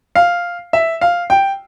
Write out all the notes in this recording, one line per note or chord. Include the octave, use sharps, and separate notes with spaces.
F5
E5
F5
G5